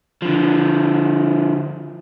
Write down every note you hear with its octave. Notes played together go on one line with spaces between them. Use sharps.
D3 F3